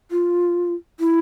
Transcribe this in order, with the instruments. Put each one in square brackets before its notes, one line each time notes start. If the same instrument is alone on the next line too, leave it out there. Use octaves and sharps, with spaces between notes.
[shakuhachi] F4
E4